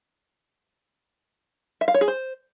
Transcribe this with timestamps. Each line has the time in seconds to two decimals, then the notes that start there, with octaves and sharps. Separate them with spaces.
1.81 E5
1.88 F5
1.94 C#5
2.01 G#4
2.08 C5